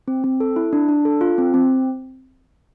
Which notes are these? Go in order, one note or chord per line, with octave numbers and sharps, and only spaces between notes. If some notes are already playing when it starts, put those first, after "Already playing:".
C4
C4
A4
E4
D4
D4
A4
F4
C4
C4